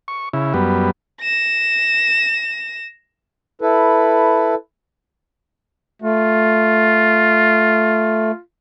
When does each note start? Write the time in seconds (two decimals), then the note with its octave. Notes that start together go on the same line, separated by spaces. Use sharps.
0.08 C#6
0.33 C#3 E4
0.54 F#2 G3 B3
1.21 A#6 E7
3.62 E4 A4 B4
6.02 A3 F4